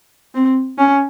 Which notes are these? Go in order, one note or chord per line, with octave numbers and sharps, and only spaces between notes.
C4
C#4